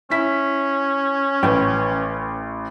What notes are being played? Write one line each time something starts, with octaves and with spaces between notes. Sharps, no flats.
C#4 E4 B6
A1 B4 G5